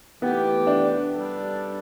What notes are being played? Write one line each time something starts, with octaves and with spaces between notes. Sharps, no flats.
E3 A3 B3 G4
D4
G3 D4 A4